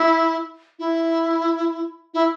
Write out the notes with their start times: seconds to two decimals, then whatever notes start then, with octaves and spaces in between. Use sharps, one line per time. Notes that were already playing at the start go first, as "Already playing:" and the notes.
Already playing: E4
0.79 E4
2.14 E4